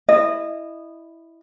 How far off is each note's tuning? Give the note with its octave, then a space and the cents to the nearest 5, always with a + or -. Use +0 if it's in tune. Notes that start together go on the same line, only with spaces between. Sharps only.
E4 +0 D#5 -20